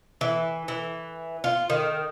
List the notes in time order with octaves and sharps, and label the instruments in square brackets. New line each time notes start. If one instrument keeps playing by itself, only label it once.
[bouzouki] E3
E3
F4
D#3